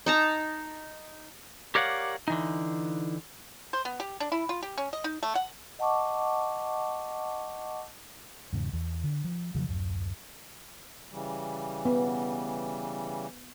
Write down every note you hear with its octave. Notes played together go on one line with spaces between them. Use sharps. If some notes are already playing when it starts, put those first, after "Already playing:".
D#4 A5 A#5
G4 A#4 C#5 D5 F5 F#5
D3 E3 D#4
C5
B3
G4
D4
E4
F4
G4
C#4
D#5
D#4
A3
F#5
D#5 F#5 A5 C#6 D6
E2 G#2 C#3
E2
D3
F3
F2 C#3 F3 F#3
D1 F#2
C#3 E3 G3
B3